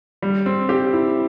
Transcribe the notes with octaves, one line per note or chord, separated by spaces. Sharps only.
G3
C4
G4
E4